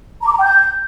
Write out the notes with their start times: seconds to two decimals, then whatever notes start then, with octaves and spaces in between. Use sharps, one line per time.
0.22 A#5
0.27 D6
0.32 A#5
0.37 G5
0.42 G6